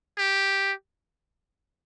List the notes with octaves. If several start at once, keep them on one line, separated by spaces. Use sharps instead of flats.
G4